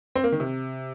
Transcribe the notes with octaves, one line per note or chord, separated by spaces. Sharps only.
C4
A#3
D#3
C3